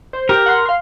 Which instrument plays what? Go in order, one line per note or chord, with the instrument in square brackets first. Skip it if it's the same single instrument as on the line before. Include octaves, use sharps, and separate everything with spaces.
[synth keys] C5
[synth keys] G4 [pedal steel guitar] A#4
[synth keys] F#5 C6
F5 C6